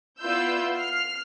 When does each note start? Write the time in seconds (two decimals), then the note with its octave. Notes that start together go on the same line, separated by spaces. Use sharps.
0.20 B3 E4 F4 D5 E6 G6
0.76 F6 C7